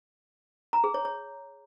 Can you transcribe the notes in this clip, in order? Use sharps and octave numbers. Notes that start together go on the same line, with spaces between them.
A#5
G#4
C#5
C#5